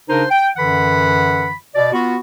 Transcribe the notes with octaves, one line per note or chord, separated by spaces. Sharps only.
C#3 D4 D#4 A#4 C5
G5
F#2 D3 E3 F#5 B5
B2 D5
B3 F4 F#4